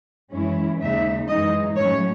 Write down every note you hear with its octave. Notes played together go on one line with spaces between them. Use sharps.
F#2 E3 G#3 C#4 E4
D#2 C#3 G#3 D#4 E5
F#2 E3 G#3 D#4 D#5
A2 F#3 A3 C#4 C#5